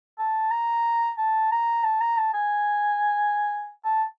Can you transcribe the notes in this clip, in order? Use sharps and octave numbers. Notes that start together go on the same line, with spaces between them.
A5
A#5
A5
A#5
A5
A#5
A5
G#5
A5